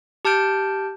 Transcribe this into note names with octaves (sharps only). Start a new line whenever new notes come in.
G4 A5 F6 G6 D7